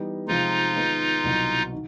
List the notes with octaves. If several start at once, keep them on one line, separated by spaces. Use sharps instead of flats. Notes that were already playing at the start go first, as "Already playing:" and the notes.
Already playing: E3 G3 B3 D#4
C3 F3 G#3 D#4 F4
D#3 G#3 B3
C2 B2 F#3
D#3